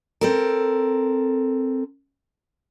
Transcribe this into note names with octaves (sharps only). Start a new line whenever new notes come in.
C4 A4 A#4